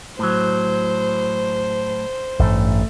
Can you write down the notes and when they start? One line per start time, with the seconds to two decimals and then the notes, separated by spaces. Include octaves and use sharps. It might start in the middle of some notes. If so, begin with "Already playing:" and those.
0.19 A2 F#3 C5
2.39 A1 G2 A3